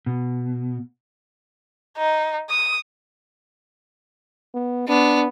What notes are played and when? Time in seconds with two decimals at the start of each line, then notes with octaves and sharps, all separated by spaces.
0.06 B2
1.98 D#4
2.50 D#6
4.54 B3
4.88 B3 D4